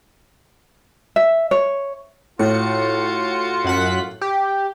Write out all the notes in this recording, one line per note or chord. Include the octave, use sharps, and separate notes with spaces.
E5
C#5
A2 F4 F#4 C#7
F#2 F#5 B6
G4